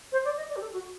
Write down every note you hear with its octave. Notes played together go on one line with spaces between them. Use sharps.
C5
D5
D#5
D5
G4
A4
F#4